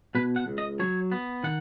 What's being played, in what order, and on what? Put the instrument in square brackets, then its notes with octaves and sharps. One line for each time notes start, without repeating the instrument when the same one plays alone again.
[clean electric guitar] B2 B4
F#5
C#2
D#5
F#3 C#5
B3
D#3 F#5